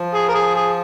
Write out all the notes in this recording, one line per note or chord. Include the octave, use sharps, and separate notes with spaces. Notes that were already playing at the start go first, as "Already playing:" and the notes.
Already playing: F3
G#4
A#4
G#4
G#4